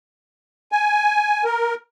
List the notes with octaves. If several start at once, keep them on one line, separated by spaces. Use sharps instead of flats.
G#5
A#4